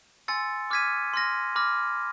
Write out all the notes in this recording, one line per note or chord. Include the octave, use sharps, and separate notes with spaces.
G#5 C6 E6 A6 C#7
D6 F6 G#6 B6 D#7
C6 F6 A#6
B5 D6 F6 A#6